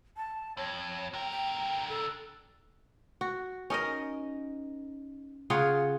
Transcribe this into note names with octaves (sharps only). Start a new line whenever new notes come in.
A5
F2 C#5
D3 A#4 G5
G5
A4
F#4
C#4 D#4 A#4 D#5
C#3 F4 G#4 F#5